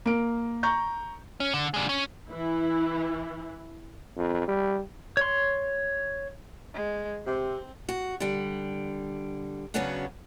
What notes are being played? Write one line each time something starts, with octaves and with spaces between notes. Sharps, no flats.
A#3 D7
A#5 C#6 G6
C#4
D3
D3 G#3
C#4
E3 E4
F2
G3
C#5 C6
G#3
C3 C4
F#4
D3 G3
C#3 F#3 B3 C#4 D4 F#4